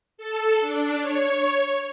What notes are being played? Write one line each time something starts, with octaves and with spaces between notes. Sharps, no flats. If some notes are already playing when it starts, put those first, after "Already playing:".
A4
D4
C#5